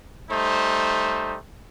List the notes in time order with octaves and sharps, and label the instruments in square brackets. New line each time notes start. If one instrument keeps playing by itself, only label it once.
[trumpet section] G3 A3 D#4 C5